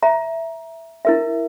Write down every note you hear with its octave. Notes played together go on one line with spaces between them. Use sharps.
E5 A#5
E4 A#4 E5